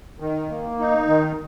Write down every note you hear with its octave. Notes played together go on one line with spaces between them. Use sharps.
D#3
A#3
D#4
D#3